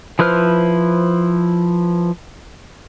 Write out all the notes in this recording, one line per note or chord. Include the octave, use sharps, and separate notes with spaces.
F3 E4 B4 C5 F6